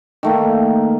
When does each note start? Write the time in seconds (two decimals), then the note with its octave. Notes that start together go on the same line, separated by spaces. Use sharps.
0.23 D#3 A3 A#3